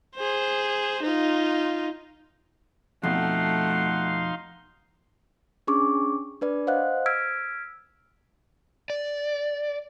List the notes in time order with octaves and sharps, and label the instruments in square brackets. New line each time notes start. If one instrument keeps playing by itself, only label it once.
[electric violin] G#4 C5
D#4 F4
[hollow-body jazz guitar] F2 B2 [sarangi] A3 [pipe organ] D#4 F5 C6 [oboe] F#5
[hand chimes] C#4 D4 G#4 C#6 D6
D4 B4 D5
C5 D#5 F5 F#5 F#6
E6 F6 G#6 B6 D7
[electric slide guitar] D5